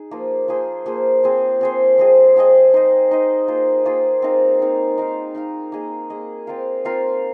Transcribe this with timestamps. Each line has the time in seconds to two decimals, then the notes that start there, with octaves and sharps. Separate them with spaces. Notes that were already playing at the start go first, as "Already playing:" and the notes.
Already playing: D#4 G#4
0.11 F3 A#3 F4
0.48 F3 A#3 G#4 C5
0.86 F3 A#3 G#4 C5
1.23 C4 G#4 C5
1.61 C4 G#4 C5
1.98 F3 C4 G#4 D#5
2.36 F3 C4 G#4 D#5
2.73 D#4 C5 D#5
3.11 D#4 C5 D#5
3.48 A#3 F4 G#4 C5
3.85 A#3 F4 G#4 C5
4.22 C4 D#4 A#4 F5
4.60 C4 D#4 A#4 F5
4.98 D#4 A#4 F5
5.35 D#4 A#4 F5
5.72 A#3 G#4 D#5
6.10 A#3 G#4 D#5
6.47 C4 F4 A#4 F5
6.85 C4 F4 A#4 F5